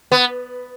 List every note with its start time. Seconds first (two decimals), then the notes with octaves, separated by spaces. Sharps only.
0.12 B3